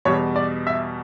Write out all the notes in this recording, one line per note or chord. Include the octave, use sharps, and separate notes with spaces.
E2 B2 G3 C#5
D5
E5